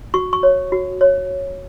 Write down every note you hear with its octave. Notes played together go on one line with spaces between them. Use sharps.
F#4 C#6
C#6
C#5
F#4
C#5